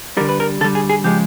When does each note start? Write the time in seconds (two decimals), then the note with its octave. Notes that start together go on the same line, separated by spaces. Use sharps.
0.17 D3 G3 A#4
0.29 B4
0.40 A#4
0.61 D3 A4
0.64 G3
0.75 G#4
0.90 G#4
1.04 C#3 F3 G#3 G4